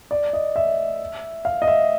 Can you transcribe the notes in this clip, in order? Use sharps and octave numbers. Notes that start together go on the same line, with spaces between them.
D5
D#5
E5
F5
D#5
E5